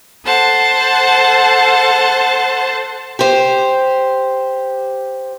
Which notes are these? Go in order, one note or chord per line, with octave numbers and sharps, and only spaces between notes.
A4 C5 F#5 A5
G4 C5